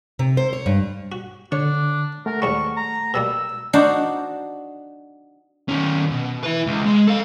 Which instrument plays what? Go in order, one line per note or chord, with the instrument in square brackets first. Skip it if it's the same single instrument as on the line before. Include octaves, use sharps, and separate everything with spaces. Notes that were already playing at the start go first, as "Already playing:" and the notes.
[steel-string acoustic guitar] C3
C5
C#5
G2
[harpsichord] F#4
[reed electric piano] D3 [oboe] D4 [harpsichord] C#5
[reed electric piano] A3 F#5 A5 [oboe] A#4
[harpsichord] D#2 G#2 G3 [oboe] C#6
[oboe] A#5
[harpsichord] B2 G3 A#3 [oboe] E6
[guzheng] D4 D#4 F#4 C5
[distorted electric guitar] D#3 C#4
B2
E4 B4
C#2
G#3
A4 F5